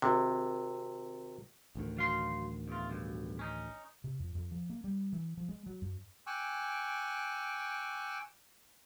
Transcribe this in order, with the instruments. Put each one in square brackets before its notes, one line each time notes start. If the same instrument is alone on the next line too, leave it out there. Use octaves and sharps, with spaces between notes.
[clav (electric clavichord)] G#1 C3
[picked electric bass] A1 D2 D#3
[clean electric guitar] F#3 F5 C6
E2 F4
B1 G2
C#4 D#4
[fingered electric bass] C3
F2
F2
F3
A#3
G3
E3
F3
G#3
F#3
F#2
[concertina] G5 G#5 C#6 D6 E6 F#6